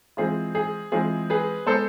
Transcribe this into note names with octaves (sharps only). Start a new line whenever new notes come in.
E3 G#3 C4 F4 G#4
G#4
E3 G#3 C4 F4 G#4
G#4 B4
G#3 B3 A4 C5